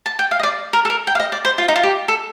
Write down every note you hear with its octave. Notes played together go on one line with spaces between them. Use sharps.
A5
G5
F5
D#5
D5
A#4
A4
A#4
G5
F5
D#5
D5
C5
F4
D#4
F4
G4
A4